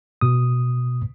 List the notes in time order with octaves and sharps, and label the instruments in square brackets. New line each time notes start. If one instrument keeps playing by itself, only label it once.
[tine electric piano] B2 D#6